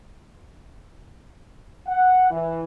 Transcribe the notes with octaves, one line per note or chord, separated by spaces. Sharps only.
F#5
E3